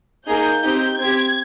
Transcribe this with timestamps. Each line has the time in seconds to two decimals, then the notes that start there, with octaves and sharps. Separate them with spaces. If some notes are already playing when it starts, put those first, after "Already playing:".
0.27 A#3 D#4 G#4 G6
0.63 C4 D#4 G4
0.99 C4 G4 G#6